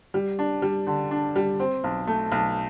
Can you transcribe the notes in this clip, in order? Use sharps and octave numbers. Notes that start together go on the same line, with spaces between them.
G3
D4
G3
D3
D4
G3
C4
B1
A3
B1